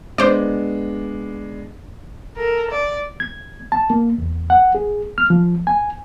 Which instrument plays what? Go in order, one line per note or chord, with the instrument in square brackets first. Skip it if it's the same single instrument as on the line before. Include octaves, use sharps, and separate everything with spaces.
[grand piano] G#3 B3 D4 [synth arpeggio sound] C5 D5
[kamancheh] A4 A#4
D5
[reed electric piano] G#6
A5
A#3
E2
F#5
G#4
F6
F3
G#5